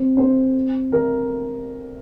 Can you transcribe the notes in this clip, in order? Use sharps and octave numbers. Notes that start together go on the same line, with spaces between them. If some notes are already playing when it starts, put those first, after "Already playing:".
Already playing: C4 C5
C4 C5
A#4